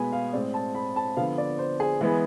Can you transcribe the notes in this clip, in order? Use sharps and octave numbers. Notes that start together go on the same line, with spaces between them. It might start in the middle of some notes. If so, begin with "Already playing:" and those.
Already playing: B2 G#3 B3 G#5 B5
F5
A2 G#3 C4 D5
A5
B5
A5
D3 F3 B3 F5
D5
C5
G#4
E3 G#3 B3